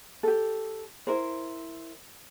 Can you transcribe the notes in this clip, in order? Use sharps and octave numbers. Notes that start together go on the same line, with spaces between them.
G4 A4
E4 A#4 C5